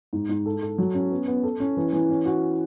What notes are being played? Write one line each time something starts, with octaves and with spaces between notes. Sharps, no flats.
G#2
G#2
A4
A4
F#3
C#4
B3
B3
A4
C#4
E3
E3
C#4
F#4